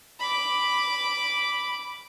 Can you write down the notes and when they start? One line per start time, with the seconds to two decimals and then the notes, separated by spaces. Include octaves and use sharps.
0.20 B5 D6